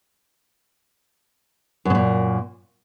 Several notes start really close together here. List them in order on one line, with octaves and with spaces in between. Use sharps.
F#2 C#3 A#2